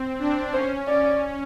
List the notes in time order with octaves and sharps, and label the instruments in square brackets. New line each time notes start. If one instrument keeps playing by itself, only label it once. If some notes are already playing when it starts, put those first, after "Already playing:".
Already playing: [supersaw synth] C4
D4
[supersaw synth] C#4 [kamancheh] C5
[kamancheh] D5